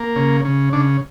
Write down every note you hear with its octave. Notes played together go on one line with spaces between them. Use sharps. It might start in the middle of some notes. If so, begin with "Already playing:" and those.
Already playing: A#3
C#3
C#3
C#3 D4